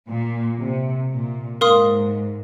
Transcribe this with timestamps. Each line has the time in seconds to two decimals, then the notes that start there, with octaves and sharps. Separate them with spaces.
0.08 A#2
0.59 C3
1.10 A#2
1.61 G#2 A#4 F5 C6 D#6